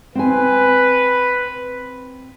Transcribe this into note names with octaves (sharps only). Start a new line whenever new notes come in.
C4 B4 G#5